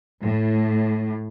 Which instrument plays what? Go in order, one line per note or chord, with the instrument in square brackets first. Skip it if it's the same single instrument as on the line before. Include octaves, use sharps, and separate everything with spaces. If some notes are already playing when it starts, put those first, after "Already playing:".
[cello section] A2